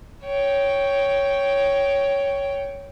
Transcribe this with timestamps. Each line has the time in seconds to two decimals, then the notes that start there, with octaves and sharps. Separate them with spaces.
0.24 C#5 G5